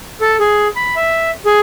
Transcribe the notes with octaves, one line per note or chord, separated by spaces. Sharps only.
A4
G#4
B5
E5
G#4